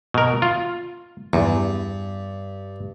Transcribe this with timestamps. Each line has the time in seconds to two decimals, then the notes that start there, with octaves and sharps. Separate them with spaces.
0.14 B2 A#4
0.42 F4
1.33 E2 G2